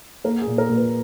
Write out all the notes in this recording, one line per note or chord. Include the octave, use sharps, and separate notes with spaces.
A#3 A#4
G#4
A#2
A#4
A#2
B4